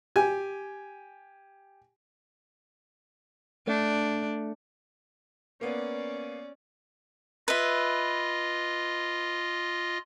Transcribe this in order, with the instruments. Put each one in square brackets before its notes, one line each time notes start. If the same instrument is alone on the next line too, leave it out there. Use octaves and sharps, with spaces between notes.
[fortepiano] G4 G#5
[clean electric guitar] A3 [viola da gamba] D4
[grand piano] A#3 B3 [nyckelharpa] C#4 D5
[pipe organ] F4 D#5 [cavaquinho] B4 E5